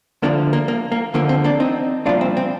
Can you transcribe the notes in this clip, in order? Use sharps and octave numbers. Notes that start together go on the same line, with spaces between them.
D2 D3 F3 A#3 D4
A#3
A#3
A#3
D#2 D3 F3 A#3
C4
A#3 D4
C4 D#4
C2 A#2 F3 D4 F4
C4
C4